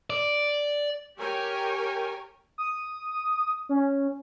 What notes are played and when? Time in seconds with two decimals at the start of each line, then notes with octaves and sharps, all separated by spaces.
0.10 D5
1.18 G4 A#4 C#5 G5 G#5
2.58 D#6
3.69 C#4